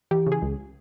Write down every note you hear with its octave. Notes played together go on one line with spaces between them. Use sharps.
E3 G4
C#3
G#4
C#2